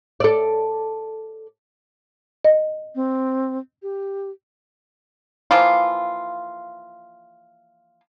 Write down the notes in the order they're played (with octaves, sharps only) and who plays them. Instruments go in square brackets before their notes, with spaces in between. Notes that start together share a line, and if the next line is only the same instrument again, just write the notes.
[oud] A4 D5
[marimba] D#5
[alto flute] C4
G4
[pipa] E3 F3 A#3 F4